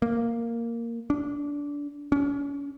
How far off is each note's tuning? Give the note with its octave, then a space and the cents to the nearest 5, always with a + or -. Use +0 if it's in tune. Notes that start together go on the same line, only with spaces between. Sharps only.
A#3 -5
D4 -20
C#4 +35